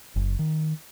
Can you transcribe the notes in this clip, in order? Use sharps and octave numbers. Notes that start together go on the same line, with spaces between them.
F#1
D#3